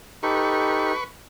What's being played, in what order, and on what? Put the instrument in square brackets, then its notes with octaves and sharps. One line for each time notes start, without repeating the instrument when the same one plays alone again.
[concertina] D#4 G4 A4 [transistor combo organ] B4 C#6